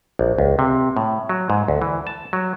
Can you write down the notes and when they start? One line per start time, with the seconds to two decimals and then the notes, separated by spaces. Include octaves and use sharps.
0.19 A#1
0.38 C#2
0.59 C3
0.97 A2
1.29 F#3
1.50 G#2
1.68 D2
1.82 E3
2.07 A5
2.33 F#3